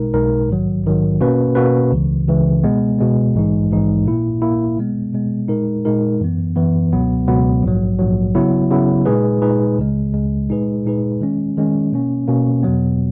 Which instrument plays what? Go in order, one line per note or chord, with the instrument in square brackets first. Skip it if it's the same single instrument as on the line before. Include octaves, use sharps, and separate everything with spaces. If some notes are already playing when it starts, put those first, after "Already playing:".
Already playing: [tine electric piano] B1 B2 G#3 D#4 A#4
B1 B2 G#3 D#4 A#4
A#1 G#2 D#3 F#3
A#1 G#2 D#3 F#3
B2 A#3 C#4 F#4 B4
B2 A#3 C#4 F#4 B4
C#2 C#3 E3
C#2 C#3 E3
B2 G#3 B3
B2 G#3 B3
A#1 G#2 E3 G#3 D#4
A#1 G#2 E3 G#3 D#4
A#2 A#3 E4
A#2 A#3 E4
B2 G#3 B3
B2 G#3 B3
A#2 G#3 D#4 A#4
A#2 G#3 D#4 A#4
F#2 E3 B3
F#2 E3 B3
C#2 B2 F#3 B3
C#2 B2 F#3 B3
A#1 G#2 F#3
A#1 G#2 F#3
C#3 F#3 B3 E4
C#3 F#3 B3 E4
A#2 G#3 D#4 G#4 B4
A#2 G#3 D#4 G#4 B4
C#2 C#3 G#3
C#2 C#3 G#3
A#2 G#3 D#4 G#4 B4
A#2 G#3 D#4 G#4 B4
D#3 G#3 C#4
D#3 G#3 C#4
B2 A#3 C#4
B2 A#3 C#4
E2 B2 F#3 B3